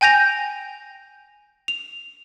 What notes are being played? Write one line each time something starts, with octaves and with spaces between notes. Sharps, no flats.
G5 G#5 G6 A#6 F7
F7